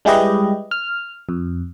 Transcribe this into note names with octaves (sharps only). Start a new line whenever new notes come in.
G3 G#3 E4 G4 B4 D#5
F6
F2